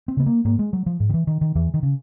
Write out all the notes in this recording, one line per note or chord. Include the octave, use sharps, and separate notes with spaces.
C4
C#3 B3
A#3
G#2 A#3
G#3
F#3
F3
G#2
D#3
E3
D#3
D#3
E2 E3
D#3
C#3